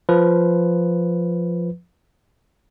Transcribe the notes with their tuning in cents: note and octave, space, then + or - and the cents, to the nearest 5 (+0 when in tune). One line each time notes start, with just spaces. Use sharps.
F3 +0 B4 +0